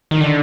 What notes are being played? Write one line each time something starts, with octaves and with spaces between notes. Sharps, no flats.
D#3
D3